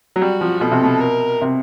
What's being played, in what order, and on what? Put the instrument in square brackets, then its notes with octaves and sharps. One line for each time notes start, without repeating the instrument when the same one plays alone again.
[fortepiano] F#3
[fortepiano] G3 [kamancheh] F#4
[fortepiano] F3
[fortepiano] B2 [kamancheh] A4
[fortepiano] C3
B2
[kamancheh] A#4
[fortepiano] C3